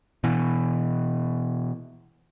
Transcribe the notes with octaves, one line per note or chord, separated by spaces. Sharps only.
B2 E3